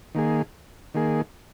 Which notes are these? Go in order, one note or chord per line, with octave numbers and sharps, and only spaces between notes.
D#3 A#3 G#4
D#3 A#3 G#4